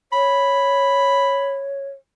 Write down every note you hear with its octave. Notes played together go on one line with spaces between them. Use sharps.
C#5 B5